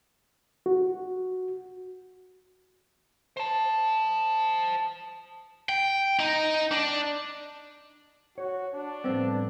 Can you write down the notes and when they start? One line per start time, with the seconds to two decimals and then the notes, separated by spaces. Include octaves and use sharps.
0.66 F#4
3.37 C5 A5
5.69 G5
6.19 D#4
6.71 D4
8.38 F#4 C#5
8.74 D4
9.04 A2 F3 G3 B3 C4